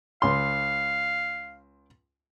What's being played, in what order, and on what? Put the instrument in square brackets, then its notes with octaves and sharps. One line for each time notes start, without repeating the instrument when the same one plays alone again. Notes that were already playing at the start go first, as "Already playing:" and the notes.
[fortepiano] C#2 C6 [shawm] F5